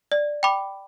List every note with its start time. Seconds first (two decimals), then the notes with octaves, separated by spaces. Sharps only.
0.12 D5
0.43 G5 B5 D6